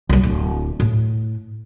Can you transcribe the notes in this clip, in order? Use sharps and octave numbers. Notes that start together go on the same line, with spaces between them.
C2 F#3
D1
A2